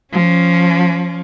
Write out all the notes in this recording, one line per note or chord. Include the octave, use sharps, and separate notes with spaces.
F3 C#4